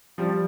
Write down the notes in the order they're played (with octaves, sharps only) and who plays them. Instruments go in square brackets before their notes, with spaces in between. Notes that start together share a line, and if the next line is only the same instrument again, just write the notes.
[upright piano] F3 G3